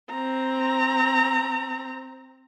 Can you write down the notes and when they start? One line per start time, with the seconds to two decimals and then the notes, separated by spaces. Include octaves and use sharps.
0.10 C4 A#5